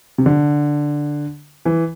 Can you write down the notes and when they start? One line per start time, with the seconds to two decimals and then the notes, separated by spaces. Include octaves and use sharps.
0.18 C3
0.26 D3
1.65 E3